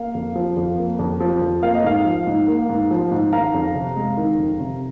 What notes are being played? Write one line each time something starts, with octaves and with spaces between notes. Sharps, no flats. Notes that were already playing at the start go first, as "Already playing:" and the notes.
Already playing: A#3 F5
F2
F3
F2
A#3
F2
F3
F2
A#3 F5
D#5
G#2 F5
F3
G#2
A#3
G#2
F3
G#2
D#3 F5 A#5
F2
C3
G#3
D#3
F2
C3